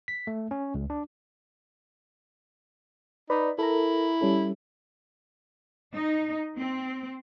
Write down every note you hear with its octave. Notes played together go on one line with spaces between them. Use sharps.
B6
A3
C#4
C#2
D4
D#4 B4 D5 B5
E4 A4 A#4 A#5
G3 C#4 A4
D#4
C4